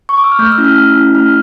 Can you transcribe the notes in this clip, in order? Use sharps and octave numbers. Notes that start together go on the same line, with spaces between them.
C#6
D6
E6
F6
A3 G6
E6
C#4 E4
F6
A3
C#4 E4
A3 F6